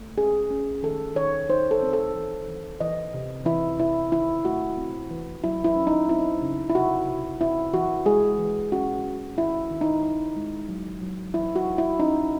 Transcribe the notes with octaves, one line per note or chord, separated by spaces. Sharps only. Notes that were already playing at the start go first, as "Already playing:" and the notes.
Already playing: A3
C#4 G#4
C#4
D#3 A4
D#3 C#5
D#4 C5
A4
C4
A4
E3
E3
E3 D#5
C3
E3 E4
C3 E4
D#3 E4
A3 F#4
C4
E3
F#3 E4
E4
C#4
D#4
C4 E4
C#3
E4
C3 F#4
C3
C4 E4
E3 F#4
G#3 G#4
E3
C#4 F#4
C#4
D#3 E4
D#3
D#4
D#4
G#3
F#3
F#3
E3 E4
F#4
D#4
E4
C#4 D#4